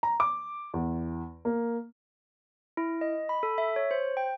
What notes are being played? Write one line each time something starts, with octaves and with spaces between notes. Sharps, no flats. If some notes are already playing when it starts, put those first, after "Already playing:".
A#5
D6
E2
A#3
E4
D#5
B5
A4
E5
C#5
C5
G5